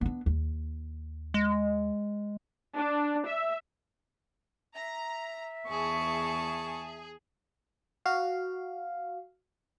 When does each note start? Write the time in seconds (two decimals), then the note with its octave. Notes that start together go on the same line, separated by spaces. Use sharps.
0.01 B3 D4
0.26 D#2
1.34 G#3
2.77 D4
3.27 E5
4.74 E5 A#5
5.69 E2 G#4 A5 C#6
8.06 F#4 F5